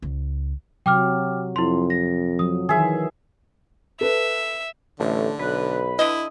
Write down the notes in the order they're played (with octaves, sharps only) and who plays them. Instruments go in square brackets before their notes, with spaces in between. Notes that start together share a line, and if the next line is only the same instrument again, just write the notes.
[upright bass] C#2
[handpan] C3 F#3 [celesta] G5 D6 F6
[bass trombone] F2 [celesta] E4 C6
[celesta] A#6
[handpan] F3 F#3 [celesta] D#6
[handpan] D#3 E3 [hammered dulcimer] G#4 E5
[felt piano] A4 B4 [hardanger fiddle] E5
[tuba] A1 [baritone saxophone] D3 [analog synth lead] A3
[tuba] B1 [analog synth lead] B4
[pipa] D3 D#5 [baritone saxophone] E4